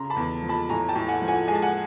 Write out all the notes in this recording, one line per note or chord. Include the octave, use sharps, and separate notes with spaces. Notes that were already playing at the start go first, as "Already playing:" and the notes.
Already playing: C#3 A#5 C6
A5 B5
E2
F3
A5 B5
A2 G#5 A#5
G5 A5
A2
F#5 G#5
F3
F#5 G#5
G#3 G#5
A5
F#5 G#5